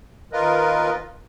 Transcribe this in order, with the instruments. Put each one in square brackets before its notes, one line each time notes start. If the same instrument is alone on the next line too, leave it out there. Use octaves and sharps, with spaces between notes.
[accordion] D#2 F4 A#4 B4 D#5